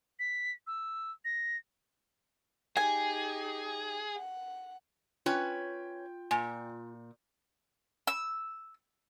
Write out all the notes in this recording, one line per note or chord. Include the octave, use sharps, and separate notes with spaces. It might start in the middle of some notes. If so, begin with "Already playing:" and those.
B6
E6
A#6
D#4 G4 G#4 G#5
F#5
C#4 F4 B4 C#5 G5
A#2 G#5
E6